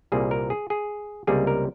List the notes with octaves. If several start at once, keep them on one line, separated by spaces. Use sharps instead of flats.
C2 A#2 G3 A#3 G#4
A#4
G#4
G#4
C#2 C3 G3 A#3 G#4
A#4